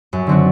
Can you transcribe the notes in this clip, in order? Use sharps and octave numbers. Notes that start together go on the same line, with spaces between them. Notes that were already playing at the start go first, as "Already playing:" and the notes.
F#2
D3 F#3 C4 F#4